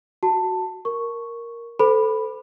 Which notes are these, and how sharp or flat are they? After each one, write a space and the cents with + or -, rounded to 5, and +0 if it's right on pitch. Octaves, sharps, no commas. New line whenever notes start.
F#4 +0 A5 +10
A#4 +0 C#6 +0
A4 +0 C5 -35 B5 +0